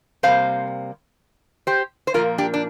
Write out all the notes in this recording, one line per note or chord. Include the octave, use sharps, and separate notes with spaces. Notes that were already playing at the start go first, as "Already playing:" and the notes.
C3 G3 A#3 C5 F5
G4 C5
C5
A#2 F3 A#3 F4 A#4
D4 G4
D4